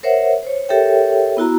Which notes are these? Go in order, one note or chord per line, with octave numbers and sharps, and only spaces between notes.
A#4 C5 C#5 E5 F#5
C5 C#5
G4 A4 A#4 C#5 E5 G5
B3 E4 F#4 A#5